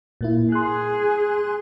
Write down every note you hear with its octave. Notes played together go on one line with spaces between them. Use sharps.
A#2 A#3 E4
G#4 C6 F#6